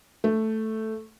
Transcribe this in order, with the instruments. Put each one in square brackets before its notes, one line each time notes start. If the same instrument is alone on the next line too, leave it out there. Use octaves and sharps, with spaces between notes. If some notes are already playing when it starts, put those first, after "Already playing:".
[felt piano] A3